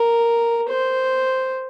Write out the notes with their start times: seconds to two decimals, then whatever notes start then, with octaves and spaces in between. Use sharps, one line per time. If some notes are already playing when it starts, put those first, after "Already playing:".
Already playing: A#4
0.70 C5